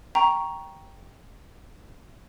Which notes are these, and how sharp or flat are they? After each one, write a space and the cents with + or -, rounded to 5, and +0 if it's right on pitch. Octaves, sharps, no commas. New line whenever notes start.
G5 +0 A#5 +10 C#6 +0